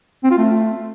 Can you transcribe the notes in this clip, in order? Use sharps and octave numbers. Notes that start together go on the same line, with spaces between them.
C4
F4
A3